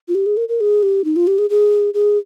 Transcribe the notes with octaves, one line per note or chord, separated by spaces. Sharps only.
F4
G4
G#4
A#4
A#4
G#4
G4
D#4
F4
G4
G#4
G#4
G#4